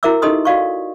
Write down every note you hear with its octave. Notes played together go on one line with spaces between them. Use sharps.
E4 F#4 A#4 E5 D6 E6
D#4 G4 A4 D#5 C6 D#6
F#4 D5 F5 C#6